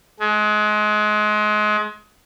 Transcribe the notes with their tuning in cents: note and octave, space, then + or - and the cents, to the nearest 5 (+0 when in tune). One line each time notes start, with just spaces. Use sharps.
G#3 +30